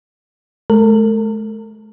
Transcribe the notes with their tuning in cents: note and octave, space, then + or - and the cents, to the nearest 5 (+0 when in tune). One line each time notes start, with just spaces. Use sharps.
A3 -45 A#4 -45